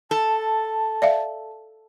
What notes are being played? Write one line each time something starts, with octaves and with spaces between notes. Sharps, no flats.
A4 A5
D5 E5 F5